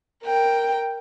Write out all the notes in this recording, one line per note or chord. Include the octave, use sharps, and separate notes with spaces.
A#4 G5